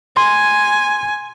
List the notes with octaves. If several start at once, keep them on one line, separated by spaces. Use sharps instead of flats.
G#5 C6